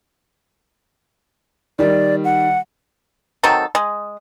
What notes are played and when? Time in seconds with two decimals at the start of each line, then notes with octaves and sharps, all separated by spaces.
1.79 D#3 G3 D5
2.25 F#5
3.43 D#3 F#3 C4 A4
3.75 G#3